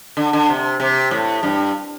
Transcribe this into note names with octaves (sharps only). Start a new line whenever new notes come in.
D3
D3
C3
C3
A2
G2